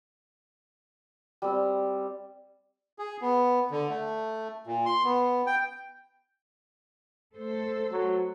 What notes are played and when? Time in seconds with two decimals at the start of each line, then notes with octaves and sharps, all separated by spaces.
1.42 G3 C4
2.99 G#4
3.22 B3
3.71 D3
3.89 A3
4.67 A#2
4.86 C6
5.04 B3
5.47 G5
7.36 A3 A4 C5
7.92 F#3